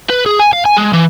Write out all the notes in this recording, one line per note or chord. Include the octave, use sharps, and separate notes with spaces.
B4
G#4
G#5
F5
G#5
G#3
E3